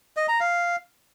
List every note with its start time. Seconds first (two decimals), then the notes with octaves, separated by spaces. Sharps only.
0.17 D#5
0.28 A#5
0.40 F5